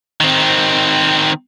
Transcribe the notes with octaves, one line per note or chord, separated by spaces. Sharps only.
D#3 C4